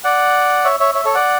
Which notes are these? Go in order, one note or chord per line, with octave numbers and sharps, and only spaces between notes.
D5 F#5
C#5 E5
C#5 E5
C#5 E5
A4 C#5
D5 F#5